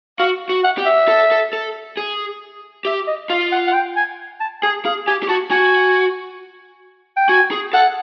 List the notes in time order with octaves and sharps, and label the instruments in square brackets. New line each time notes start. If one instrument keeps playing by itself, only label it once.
[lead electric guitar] F#4 [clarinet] F5
[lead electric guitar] F#4
[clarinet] F#5
[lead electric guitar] G4
[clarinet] E5
[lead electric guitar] A4
A4
A4
G#4
[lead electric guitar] G4 [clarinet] E5
[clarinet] D#5
[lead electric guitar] F4 [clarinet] F5
[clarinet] F#5
F#5
G5
G#5
A5
[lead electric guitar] G#4 [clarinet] G#5
[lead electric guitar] G#4 [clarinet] F5
[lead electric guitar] G4 [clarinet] G#5
[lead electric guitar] G4
[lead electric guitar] F#4 [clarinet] A5
[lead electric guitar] F#4 [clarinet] G#5
[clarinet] G5
[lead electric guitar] F#4 [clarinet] G#5
[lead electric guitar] G#4
[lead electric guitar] A4 [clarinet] F#5